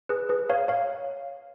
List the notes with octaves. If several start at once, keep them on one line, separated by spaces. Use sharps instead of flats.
G#4 B4
G#4 B4
C#5 F5
C#5 F5